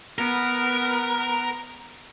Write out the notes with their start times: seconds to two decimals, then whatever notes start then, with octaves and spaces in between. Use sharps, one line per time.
0.18 B3 A#4